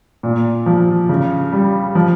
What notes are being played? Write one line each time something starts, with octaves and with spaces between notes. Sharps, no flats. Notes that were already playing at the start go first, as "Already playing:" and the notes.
A#2
F3
C#3
G3
F3